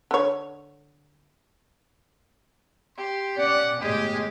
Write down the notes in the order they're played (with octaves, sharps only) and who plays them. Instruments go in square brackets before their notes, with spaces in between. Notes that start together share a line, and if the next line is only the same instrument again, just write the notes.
[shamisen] D3 C#5
[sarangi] G4 [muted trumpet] C6
[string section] C#4 D5 [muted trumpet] F#5
[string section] G1 A2 [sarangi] G#3 [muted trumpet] G4